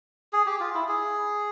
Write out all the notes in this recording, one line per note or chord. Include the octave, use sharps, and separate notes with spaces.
G#4
G4
F4
E4
G#4